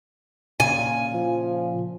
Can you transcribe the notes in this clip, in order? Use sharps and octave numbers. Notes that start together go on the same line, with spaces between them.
A#2 C#3 G#5
F3